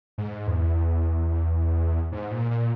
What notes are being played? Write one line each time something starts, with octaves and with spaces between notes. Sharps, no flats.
G#2
E2
G#2
A#2
A#2